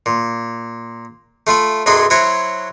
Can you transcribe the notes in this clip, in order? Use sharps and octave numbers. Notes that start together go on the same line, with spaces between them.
A#2
A3 F4 E5 B5
B1 F#2 F#3 G#4 B5 C6
F#3 E4 F#4 C5 C#5